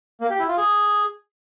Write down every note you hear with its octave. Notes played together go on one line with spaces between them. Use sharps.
A#3
G4
E4
F4
G#4